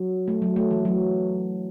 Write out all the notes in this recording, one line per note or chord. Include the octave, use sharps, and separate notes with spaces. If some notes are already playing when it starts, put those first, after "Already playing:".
Already playing: F#3
A3
F#3
A3
E3
F#3